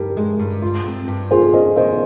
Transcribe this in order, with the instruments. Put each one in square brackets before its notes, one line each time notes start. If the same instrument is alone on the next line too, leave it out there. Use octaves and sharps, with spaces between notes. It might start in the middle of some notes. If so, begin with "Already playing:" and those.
Already playing: [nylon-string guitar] G2 [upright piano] G4 A#4
[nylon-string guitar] G#3
G2
F4
C4
G2
[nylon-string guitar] F4 [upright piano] G#4 C5
[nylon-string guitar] C#4 [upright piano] C5 D#5
[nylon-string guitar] D#3 [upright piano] C5 D#5